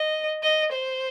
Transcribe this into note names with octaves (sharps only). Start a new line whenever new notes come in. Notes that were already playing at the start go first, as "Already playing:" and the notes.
Already playing: D#5
D#5
C5